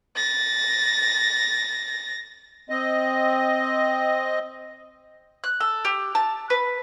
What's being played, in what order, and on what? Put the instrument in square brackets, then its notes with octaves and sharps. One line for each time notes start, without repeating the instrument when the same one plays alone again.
[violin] A6 A#6
[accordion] C4 D#5
[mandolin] F#6
A4
G4
A5
B4